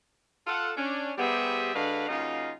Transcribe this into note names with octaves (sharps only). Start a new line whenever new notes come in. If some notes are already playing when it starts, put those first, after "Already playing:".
F4 A4 F#5
C#4 D4
G3 B3 G4 G#4 C5 E5
D3 G#3 F#4 B4 F5
C#3 F#3 A#3 D#4 F4